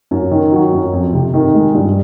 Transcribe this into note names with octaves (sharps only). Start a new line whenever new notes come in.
F#2
D#3
F#3
F#2
F2
C3
D#3
G#3
G2